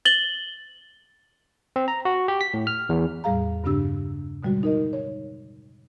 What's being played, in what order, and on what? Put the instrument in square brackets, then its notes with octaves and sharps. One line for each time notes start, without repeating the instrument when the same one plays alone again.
[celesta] A6 F#7 G7
[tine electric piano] C4
A#5
F#4
G4
B6
A2
F6
E2
[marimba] E2 A2 G3 G#4 F5 A#5
G2 C#3 C4 D4 G4 E6
B2 D3 G3 G#3 F#4
D#4 A#4 D#5
C#5